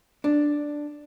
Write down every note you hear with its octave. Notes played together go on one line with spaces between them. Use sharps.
D4